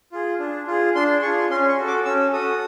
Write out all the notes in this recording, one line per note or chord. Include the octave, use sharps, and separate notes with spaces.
F4 G#4
D4
F4 G#4
D4 C6
F4 G#4 C#6
C#4 C6
C#6
F#4 A4
D6
C#4 E6
F#4 A4 D#6